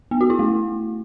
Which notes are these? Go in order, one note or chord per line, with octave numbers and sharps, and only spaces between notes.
B3
F#4
E4
A3